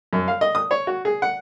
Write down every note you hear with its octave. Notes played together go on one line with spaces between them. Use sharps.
F#2
F5
D#5
D#6
C#5
F#4
G#4
F#5